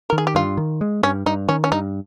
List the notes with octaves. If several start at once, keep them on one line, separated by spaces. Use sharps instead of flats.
A#4
D#3
G#4
G4
G2 F4
D#3
G#3
G2 C#4
G2 D#4
D#3 C#4
C#4
G2 D#4